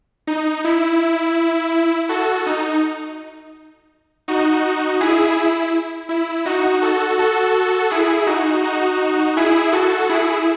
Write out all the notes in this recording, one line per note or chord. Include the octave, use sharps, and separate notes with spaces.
D#4
E4
F#4 A4
D#4
D#4 F#4
E4 G#4
E4
E4
D#4 F#4
F#4 A4
F#4 A4
E4 G#4
D#4 F#4
D#4 F#4
E4 G#4
F#4 A4
E4 G#4